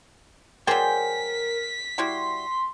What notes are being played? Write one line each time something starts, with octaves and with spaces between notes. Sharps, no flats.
F#3 G#4 A#4 C5 D5 G5 B6
G3 E4 F#4 C6